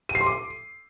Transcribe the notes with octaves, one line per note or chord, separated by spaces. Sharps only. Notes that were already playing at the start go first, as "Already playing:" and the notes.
D#7
C7
C6
D6